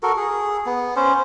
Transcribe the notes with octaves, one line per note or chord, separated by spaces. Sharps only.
F#4 A4 A#4
G#4
B3
C#4 C5